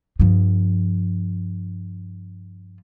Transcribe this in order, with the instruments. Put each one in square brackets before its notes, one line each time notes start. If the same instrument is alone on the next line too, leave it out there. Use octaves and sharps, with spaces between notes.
[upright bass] G2 F3